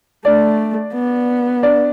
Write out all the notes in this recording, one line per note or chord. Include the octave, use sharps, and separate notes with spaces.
A3 D4 D5
B3
D4 D5